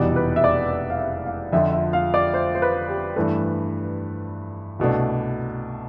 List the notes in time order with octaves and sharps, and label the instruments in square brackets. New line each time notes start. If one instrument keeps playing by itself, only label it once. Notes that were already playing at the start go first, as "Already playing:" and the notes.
Already playing: [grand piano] F1 E2 B2 G3 B3 [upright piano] D5
[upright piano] B4
E5
D5
D5
F5
E5
F5
[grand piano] F2 D3 F3 [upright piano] E5
[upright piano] E5
F5
D5
C5
C5
B4
G4
[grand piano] G2 E3 A3 [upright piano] B4
[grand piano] C2 B2 A3 D4